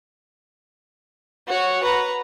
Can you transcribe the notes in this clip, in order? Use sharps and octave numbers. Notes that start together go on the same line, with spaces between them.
F#4 C#5
B4 A#5